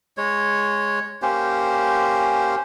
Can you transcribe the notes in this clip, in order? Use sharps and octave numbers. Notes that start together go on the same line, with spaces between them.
G#3 C#5
A#3 C#4 G4 C5